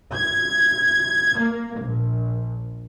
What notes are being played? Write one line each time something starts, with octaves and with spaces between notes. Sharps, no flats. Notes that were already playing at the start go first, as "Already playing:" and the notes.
G#6
A#3
A#1